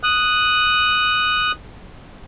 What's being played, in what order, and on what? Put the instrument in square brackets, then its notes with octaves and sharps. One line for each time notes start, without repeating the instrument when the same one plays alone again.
[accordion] D#6 F#6